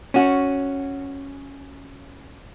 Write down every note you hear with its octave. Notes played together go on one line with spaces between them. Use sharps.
C#4 F#4